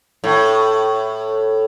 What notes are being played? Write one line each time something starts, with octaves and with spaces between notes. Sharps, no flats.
A2